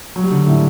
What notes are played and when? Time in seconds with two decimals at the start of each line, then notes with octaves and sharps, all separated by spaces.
0.16 F#3
0.24 G3
0.31 D3
0.47 A2